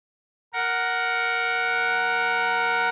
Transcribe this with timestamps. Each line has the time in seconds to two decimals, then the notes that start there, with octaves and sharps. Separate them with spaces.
0.53 A#4 F#5